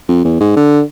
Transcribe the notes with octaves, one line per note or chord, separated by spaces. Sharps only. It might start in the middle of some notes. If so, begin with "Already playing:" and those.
F2
E2
G#2
D3